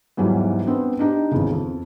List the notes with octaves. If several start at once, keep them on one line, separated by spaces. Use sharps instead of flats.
E2 G#2 E3 F#3 G3
B3 C4 D4 B4
D4 D#4 G4
G#1 E2 C#3
F2